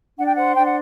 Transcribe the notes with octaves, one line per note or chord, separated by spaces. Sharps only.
D4 F#5
G5
C5 F#5
D4 G5
F#5